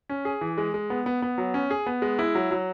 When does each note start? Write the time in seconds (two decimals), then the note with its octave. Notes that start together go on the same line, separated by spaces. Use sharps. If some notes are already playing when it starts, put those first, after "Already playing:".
0.09 C#4
0.25 G#4
0.41 E3
0.58 G#3
0.74 G#3
0.90 B3
1.06 B3
1.22 B3
1.38 F#3
1.54 C#4
1.71 G#4
1.87 B3
2.02 G#3
2.19 E4
2.35 F#3
2.51 F#3